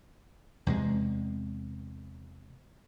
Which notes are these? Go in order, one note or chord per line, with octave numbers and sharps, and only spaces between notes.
E2 C3 G#3